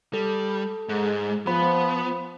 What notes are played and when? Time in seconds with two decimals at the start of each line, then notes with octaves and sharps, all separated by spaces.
0.14 G3 A4
0.89 G#2 G#3
1.47 F3 B3 C5 B5